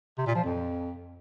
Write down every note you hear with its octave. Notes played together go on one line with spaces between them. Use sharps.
C3
A#2
F3
F2